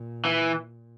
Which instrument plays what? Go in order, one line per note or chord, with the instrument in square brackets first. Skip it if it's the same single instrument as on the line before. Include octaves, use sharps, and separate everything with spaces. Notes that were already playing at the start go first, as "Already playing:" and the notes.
Already playing: [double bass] A#2
[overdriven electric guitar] E3